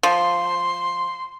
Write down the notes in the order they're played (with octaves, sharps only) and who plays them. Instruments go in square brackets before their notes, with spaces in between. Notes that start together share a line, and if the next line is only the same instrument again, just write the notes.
[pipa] F3 [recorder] C6